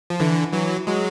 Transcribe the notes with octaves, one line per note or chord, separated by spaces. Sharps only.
F3
D3 E3
E3 F#3
F#3 G#3